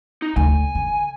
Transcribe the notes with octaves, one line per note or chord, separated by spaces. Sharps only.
D#4
D2 G#5
D3